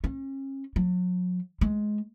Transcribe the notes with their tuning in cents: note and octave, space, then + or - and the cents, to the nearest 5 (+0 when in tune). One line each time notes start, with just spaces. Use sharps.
C#4 -40
F#3 -40
G#3 +15